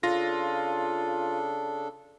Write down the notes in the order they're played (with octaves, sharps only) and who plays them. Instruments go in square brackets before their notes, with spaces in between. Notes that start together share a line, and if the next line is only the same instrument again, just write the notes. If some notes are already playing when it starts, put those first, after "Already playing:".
[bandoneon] C#3 D4 A4 [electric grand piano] F4 A#6